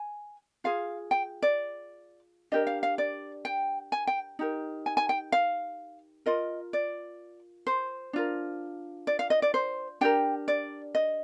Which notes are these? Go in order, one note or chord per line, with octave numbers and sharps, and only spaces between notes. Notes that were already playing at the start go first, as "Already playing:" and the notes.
Already playing: G#5
F4 G#4 F5
G5
D5
D4 G4 A#4 D#5
F5
F5
D5
G5
G#5
G5
D#4 G4 A#4
G#5
G#5
G5
F5
F4 A#4 D#5
D5
C5
D4 F4 A#4
D5
F5
D#5
D5
C5
D4 G4 A#4 G5
D5
D#5